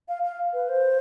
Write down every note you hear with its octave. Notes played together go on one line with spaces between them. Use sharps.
F5
F5
B4
C5